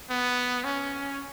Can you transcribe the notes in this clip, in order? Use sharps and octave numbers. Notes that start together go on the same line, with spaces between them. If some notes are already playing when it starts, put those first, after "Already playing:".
B3
C#4